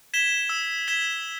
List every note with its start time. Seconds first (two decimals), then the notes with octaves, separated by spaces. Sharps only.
0.14 G#6 B6 E7 G7
0.49 E6
0.88 G#6 B6 E7 G7